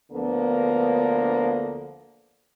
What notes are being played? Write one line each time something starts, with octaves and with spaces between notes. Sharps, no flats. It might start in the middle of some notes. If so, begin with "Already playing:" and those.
D2 D3 F3 A#3 B3